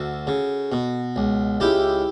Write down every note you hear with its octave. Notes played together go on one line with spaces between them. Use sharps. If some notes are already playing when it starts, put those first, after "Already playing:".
Already playing: D2 F#4 A4
C#3
B2
C#2
C#2 E4 G4